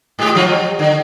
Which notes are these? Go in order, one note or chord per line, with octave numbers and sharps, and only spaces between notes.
G#2 G#3 G4
F3 F#3 F4
G3
D3